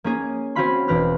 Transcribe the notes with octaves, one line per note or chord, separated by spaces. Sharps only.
A#3 C#4 G#4
C4 C#4 F#4 F5 B5 C6
E1 C4 B4 F6